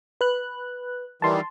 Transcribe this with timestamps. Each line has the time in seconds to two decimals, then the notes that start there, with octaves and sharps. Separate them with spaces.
0.21 B4 F#6
1.22 D#3 E3 G3 A5 C6